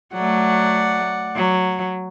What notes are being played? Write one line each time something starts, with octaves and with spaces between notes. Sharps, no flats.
F#3 A3 D5 F#5
F#3